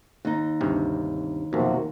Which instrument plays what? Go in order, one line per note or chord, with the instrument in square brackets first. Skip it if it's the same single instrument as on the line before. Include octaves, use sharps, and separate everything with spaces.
[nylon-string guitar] D#2 D#4
[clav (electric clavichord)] D2 G2 C3
[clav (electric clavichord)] B1 F2 [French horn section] C3 A#3 F#4